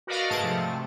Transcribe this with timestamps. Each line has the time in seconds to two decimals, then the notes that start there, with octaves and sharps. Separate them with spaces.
0.07 F#4 A#4 B4 D5 D#5 F5
0.30 G#2 A3 G#4 D#5 A5 D7
0.43 C3 F3 A3